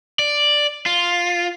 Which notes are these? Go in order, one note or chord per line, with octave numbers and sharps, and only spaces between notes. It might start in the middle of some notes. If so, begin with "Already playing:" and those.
D5
F4